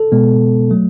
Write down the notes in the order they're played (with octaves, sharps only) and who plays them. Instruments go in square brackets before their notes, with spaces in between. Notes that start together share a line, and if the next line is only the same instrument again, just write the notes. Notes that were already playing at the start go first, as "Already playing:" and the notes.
Already playing: [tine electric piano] A4
B2 G#3 B3
F#3 A3